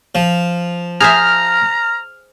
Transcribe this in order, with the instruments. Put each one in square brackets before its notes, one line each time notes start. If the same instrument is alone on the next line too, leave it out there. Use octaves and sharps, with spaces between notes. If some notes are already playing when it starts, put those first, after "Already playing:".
[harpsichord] F3
[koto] G#4 C5 E5 [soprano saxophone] A#5 [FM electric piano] F6